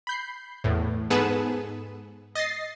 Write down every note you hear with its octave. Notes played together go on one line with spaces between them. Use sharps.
B5 G6 C7
E2 A2
G#2 B3 G#4 A4 B4 E7
D#5 A6 A#6 C7